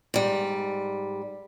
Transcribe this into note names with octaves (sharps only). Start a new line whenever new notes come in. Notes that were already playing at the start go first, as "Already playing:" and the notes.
G#2 G3